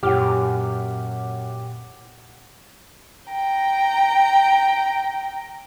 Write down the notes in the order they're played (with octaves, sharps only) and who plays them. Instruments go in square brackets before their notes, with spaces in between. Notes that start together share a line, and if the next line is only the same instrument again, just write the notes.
[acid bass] F#2 [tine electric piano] A#2 D6 F6 [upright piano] G4 C#5 F#5
[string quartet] G5 A#5